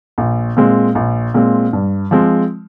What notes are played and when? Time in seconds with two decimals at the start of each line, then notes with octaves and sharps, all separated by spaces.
0.18 A#1
0.57 A#2 G#3 C4
0.95 A#1
1.34 A#2 G#3 C4
1.73 G2
2.11 F3 G#3 C4